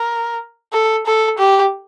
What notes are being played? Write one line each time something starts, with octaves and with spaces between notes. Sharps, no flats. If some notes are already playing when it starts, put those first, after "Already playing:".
Already playing: A#4
A4
A4
G4